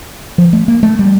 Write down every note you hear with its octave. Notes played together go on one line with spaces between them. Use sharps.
F3
A3
A#3
A3
G3